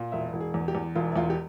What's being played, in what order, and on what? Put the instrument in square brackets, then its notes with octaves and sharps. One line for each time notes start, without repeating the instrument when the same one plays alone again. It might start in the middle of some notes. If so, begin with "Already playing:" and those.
Already playing: [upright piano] A#2
E1 E5
E1
G#4
E2
G4
E2
E1 F4
E4
E2 F4
G4